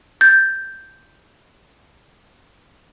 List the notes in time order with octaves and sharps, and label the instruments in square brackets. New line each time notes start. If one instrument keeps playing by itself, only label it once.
[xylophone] G6 A6